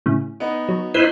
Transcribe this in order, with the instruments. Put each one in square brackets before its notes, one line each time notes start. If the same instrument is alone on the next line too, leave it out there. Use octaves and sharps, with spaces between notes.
[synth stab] A2 C#3
[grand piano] B3 D#4 D#5
[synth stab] F#3
[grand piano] D#4 F#7 G7 [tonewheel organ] E4 B4 C5